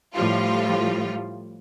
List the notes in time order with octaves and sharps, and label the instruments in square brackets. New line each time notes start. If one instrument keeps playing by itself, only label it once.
[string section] A2 F3 G3 F4